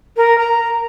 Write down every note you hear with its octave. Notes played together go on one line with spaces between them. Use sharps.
A#4
A#5